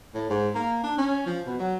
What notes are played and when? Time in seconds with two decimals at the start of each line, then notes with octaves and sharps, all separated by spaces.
0.14 A2
0.29 G#2
0.55 A#3
0.83 D4
0.98 C#4
1.26 F3
1.46 B2
1.59 F#3